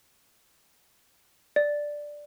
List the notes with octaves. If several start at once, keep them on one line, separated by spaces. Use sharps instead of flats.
D5